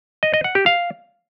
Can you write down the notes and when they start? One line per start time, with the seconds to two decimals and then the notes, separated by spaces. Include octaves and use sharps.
0.23 D#5
0.34 D#5
0.44 F#5
0.55 G4
0.66 F5